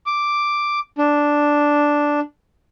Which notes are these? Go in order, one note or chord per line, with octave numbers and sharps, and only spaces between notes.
D6
D4